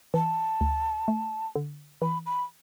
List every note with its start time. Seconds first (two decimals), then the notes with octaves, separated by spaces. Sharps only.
0.14 E3 A5
0.61 D2
1.08 A3
1.56 D3
2.02 E3 B5
2.26 B5